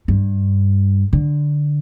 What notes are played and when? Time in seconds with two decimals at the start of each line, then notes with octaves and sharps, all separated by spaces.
0.08 G2
1.13 D3